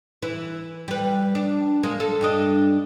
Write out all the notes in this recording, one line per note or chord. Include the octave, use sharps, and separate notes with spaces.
E3 E4
G3 B4
D4
G#3 A#3
A4
G2 D4 D#5